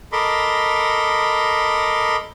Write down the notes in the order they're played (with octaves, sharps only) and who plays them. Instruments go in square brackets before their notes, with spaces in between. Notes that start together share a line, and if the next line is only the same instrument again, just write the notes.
[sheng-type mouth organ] A4 A#4 D#5 B5 C6 D6